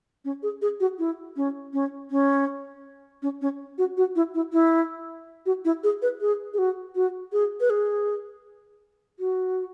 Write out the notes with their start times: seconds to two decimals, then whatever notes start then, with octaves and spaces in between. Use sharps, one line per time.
0.25 C#4
0.43 G#4
0.62 G#4
0.80 F#4
0.99 E4
1.37 C#4
1.73 C#4
2.11 C#4
3.22 C#4
3.42 C#4
3.78 F#4
3.97 F#4
4.16 E4
4.34 E4
4.53 E4
5.46 F#4
5.65 E4
5.84 G#4
6.02 B4
6.21 G#4
6.54 G#4
6.58 F#4
6.95 F#4
7.33 G#4
7.60 B4
7.70 G#4
9.19 F#4